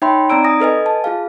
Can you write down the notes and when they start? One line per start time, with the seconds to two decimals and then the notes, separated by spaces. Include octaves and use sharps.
0.02 D#4 C#5 E5 G5 B5 C6
0.30 C4 D#4 D5 A#5 E6 D7
0.44 G#5 D#6 A#6
0.60 A4 B4 D#5 G#5
0.86 A5
1.04 F4 G#4 F5